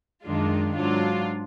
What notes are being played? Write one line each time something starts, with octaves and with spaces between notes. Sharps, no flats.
F#2 D#3 G#3 D4 F4
G#2 F#3 D4 F4